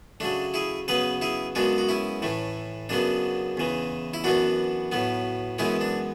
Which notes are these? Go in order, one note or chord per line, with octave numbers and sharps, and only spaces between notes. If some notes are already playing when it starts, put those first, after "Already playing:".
C#3 F#3 A3 D4
E4 G#4
C#3 F#3 B3 G#4 B4
E4 G#4
F#2 C#3 G#3 B3 D4 F#4
F#4
C#4 E4
A2 E3 A3
F#2 C#3 F#3 B3 D4
E2 C#3 E3
E4
F#2 E3 B3 D4 F#4
A2 F#3 B3
F#2 E3 G#3 B3 C#4 E4
D4